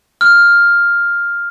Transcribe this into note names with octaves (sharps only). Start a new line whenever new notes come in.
F6